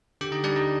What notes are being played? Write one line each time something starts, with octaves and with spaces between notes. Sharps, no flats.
D3 G4 G5
D#4 D#5
G3 D4 D5
D#4 D#5